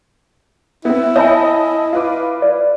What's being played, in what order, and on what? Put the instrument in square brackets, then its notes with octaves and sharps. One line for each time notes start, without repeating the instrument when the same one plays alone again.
[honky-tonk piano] B3 C4 [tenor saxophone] E4
[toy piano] C#5 E5 G#5 [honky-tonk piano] D#5 A5 B5
[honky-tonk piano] F4 B4 D6
[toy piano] D5